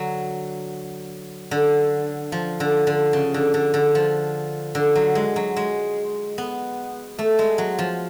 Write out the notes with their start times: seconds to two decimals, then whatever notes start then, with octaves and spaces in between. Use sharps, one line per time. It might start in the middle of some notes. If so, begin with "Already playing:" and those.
Already playing: D3 F#3
1.51 D3
2.32 F3
2.60 D3
2.87 D3
3.13 C#3
3.34 D3
3.54 D3
3.74 D3
3.95 F3
4.75 D3
4.96 F#3
5.15 G#3
5.36 F#3
5.57 G#3
6.38 B3
7.19 A3
7.39 G#3
7.58 F#3
7.78 F3